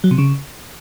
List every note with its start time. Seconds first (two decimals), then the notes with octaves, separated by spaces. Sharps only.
0.04 F#3
0.11 C3
0.18 C#3